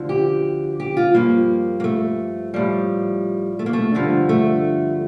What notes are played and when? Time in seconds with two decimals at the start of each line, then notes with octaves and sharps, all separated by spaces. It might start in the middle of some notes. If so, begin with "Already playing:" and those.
Already playing: D2 D3 F3
0.09 G4
0.80 G4
0.97 F4
1.14 G2 F3 A#3
1.80 A#3
1.84 A3
2.54 A2 F3 G3
3.59 A3
3.66 A#3
3.73 A3
3.94 G2 D3 F3
4.29 A3